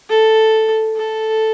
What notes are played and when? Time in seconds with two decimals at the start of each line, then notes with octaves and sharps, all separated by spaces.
0.09 A4
0.97 A4